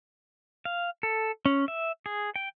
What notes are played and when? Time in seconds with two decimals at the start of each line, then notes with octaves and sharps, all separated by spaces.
0.65 F5
1.03 A4
1.46 C#4
1.68 E5
2.06 G#4
2.36 G5